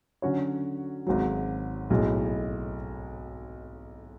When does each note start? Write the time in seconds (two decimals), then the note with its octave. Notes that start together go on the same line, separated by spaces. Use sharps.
0.22 D3 F#3 C#4 F#4 C#5
1.07 G#1 G#2 F#3
1.90 B1 A2 G#3